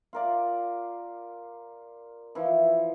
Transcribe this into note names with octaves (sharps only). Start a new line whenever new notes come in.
F4 A#4 D5
E3 F3 E4